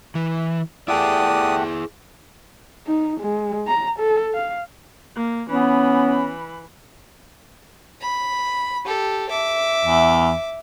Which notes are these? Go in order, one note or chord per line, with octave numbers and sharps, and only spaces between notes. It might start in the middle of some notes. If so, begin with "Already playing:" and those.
E3
A3 E4 G4 G#4 D5 F#5 D#6
D#4
G#3
A#5
A4
F5
A#3
E3 B3 C#4 B5
B5
G4 A4
E5 D6
E2